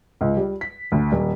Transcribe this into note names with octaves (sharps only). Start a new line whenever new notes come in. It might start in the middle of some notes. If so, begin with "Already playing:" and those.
C#2
G3
B6
D2
D#1